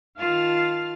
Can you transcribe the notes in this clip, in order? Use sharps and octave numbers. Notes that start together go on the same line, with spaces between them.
D#3 F4 F5 A5 F6